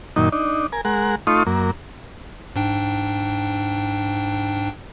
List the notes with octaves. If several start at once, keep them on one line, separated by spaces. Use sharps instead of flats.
F#2 A#2 D#3 D#4
D4 D#4
A#4 G#5
G#3 A#4 F#5
A3 D#4 F4 C6 C#6 D#6
F#2 A#3
G#2 D4 G5